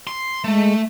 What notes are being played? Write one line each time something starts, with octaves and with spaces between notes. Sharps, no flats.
C6
G#3 A3